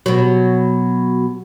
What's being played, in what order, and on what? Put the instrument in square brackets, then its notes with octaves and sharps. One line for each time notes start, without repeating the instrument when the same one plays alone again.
[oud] B2 F#3